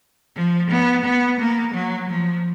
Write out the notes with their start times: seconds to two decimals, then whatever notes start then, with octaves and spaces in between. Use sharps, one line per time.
0.36 F3
0.70 B3
1.05 B3
1.40 A#3
1.74 F#3
2.09 F3